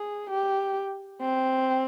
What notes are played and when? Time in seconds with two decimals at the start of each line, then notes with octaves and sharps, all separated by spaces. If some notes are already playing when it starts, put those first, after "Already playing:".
Already playing: G#4
0.30 G4
1.22 C4